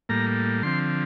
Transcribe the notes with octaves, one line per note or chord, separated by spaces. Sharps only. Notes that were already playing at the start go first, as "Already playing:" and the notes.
A2 G3 A#3 A#5
D3 F3 C4 C6